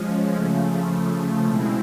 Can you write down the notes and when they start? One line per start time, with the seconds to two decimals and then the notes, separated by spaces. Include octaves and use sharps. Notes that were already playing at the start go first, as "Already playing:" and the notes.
Already playing: F3 G#3 C#4
0.31 C#3 F3 A3
1.45 B2 G#3 C4 E4